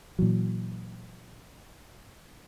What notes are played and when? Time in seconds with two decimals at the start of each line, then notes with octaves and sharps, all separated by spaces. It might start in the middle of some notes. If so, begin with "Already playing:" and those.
0.19 A#2 E3 F#3